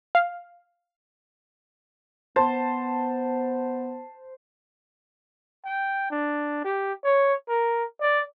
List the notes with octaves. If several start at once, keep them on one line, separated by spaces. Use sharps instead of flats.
F5
B3 C5 A5
G5
D4
G4
C#5
A#4
D5